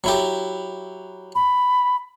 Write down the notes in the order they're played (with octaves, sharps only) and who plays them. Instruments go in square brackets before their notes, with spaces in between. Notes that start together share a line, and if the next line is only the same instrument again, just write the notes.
[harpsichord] F#3 E4 G4
[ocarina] B5